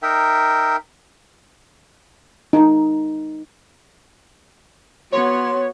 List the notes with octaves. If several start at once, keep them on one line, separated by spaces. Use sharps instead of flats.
D#4 A#4 E5 G5
D#4
B3 F#4 C#5 C6